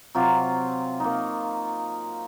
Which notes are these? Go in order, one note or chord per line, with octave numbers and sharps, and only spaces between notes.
C3 F#3 F4 D6
A#3 D#4